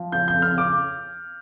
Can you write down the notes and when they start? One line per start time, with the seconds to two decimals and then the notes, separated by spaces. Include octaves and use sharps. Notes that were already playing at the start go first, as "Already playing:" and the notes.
Already playing: F3
0.12 C#3 G6
0.28 G6
0.33 F2
0.42 F6
0.52 C#3
0.58 D6